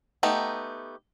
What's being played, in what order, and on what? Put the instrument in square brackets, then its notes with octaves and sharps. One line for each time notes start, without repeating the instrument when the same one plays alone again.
[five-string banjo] A3 B3 D#4 G4